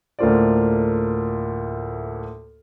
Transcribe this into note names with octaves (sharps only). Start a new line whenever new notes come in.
D2 A2 A#3 F4 C5 D5